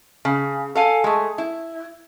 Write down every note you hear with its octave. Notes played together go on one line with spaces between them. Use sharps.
C#3
A4 F5 G#5
G#3 A3
E4